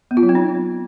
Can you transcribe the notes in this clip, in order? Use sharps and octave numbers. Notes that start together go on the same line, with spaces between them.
B3
F4
F#3
C4
D#4